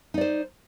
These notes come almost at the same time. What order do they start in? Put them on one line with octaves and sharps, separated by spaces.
D#4 D5 C5